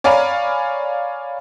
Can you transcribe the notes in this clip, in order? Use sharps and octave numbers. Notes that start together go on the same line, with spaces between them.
C#5 D5 F5 G#5 A#5 B5